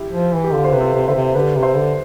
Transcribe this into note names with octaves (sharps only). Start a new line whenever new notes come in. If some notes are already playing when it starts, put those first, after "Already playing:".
Already playing: E4 G4
F3
E3
G4
D3 F4 A4
C5
C3 B4
F4 A4
C3
D3 C5 E5
C3
D3 G4 B4
C3
C5 E5
D3